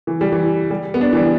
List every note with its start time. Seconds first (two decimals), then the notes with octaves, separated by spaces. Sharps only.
0.07 E3
0.21 G3
0.32 E3
0.71 G3
0.94 B3
1.01 D4
1.13 E3
1.17 G3